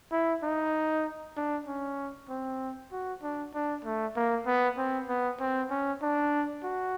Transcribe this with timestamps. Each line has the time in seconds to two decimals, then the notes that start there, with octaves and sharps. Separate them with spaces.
0.12 E4
0.43 D#4
1.37 D4
1.67 C#4
2.29 C4
2.92 F#4
3.22 D4
3.54 D4
3.85 A3
4.16 A#3
4.47 B3
4.78 C4
5.09 B3
5.40 C4
5.70 C#4
6.02 D4
6.64 F#4